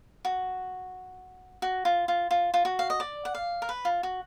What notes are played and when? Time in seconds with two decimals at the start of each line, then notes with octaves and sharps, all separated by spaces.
0.25 F#4
1.62 F#4
1.85 F4
2.08 F4
2.31 F4
2.54 F4
2.65 F#4
2.79 F5
2.90 D#5
3.00 D5
3.25 F#5
3.35 F5
3.62 A#4
3.69 B4
3.85 F4
4.03 F#4